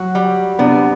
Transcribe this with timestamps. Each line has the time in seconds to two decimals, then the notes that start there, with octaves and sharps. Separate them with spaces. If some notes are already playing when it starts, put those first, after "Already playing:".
Already playing: F#3 F#4
0.15 G3
0.59 C3 B3 D4